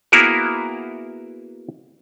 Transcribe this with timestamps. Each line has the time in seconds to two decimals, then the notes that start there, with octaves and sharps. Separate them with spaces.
0.12 A#3 B3 E4 F#4 G#4 A#4